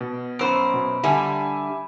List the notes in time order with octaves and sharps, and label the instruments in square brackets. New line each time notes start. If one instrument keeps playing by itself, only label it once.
[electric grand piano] B2
[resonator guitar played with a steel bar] F#2 C5 [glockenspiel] B5 E6 D7
[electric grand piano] B2
[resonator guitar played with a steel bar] D3 G3 [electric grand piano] E5 G#5